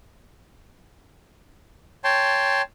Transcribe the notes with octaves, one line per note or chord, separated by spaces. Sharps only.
C#5 G5 A5 C6